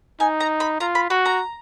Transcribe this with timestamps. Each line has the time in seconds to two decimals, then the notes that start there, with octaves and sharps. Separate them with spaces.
0.20 D#4 G#5
0.40 A#5
0.60 B5
0.80 F4 A#5
0.95 B5
1.10 F#4 B5
1.26 A#5